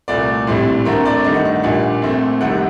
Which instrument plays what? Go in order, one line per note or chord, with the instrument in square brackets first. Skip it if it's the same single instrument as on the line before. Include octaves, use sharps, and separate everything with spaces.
[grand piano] C2 A#2 A3 D5
A#1 A2 G3 C4
D2 D3 A3 C4 A#4
D5
G2 D#3 A3 D#5
F#5
D#5
A#1 A#2 G3 D4 F#5
A#1 A#2 A3 C4
C2 C3 D#3 G3 F#5